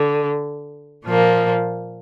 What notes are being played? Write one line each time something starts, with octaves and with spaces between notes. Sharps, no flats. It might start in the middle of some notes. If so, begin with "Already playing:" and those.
Already playing: D3
A#2 F3 A#3